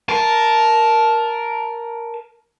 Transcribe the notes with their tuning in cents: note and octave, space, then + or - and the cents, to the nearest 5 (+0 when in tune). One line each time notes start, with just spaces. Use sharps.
A#4 +5 A5 -5